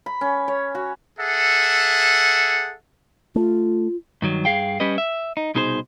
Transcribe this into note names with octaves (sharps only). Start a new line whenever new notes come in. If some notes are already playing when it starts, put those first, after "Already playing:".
B5
C#4
C#5
F#4
G#4 A4 E5 F#5
A3 F4
G2 D#3 F#3
G2 G#4 F5 G5
G3 C#4 G4 B4 D#5
E5
D#4
C2 B2 D#4 G#4 A#4 C5